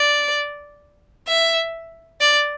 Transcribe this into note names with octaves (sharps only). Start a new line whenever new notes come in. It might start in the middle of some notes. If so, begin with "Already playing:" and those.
Already playing: D5
E5
D5